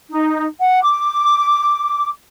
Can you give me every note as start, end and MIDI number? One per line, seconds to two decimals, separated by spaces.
0.10 0.46 63
0.60 0.80 78
0.82 2.09 86